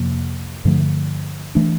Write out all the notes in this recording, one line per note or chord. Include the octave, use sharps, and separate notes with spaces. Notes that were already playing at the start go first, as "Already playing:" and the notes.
Already playing: F2 C3 F3 A#3
G2 D3 F3 A3
E3 A3 D4